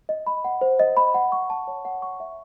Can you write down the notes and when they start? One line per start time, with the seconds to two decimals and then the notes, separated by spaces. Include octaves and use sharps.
0.09 D#5
0.27 B5
0.45 F#5
0.61 C5
0.79 D#5
0.97 B5
1.14 F#5
1.32 C#6
1.50 A5
1.68 C#5
1.85 F#5
2.02 C#6
2.20 E5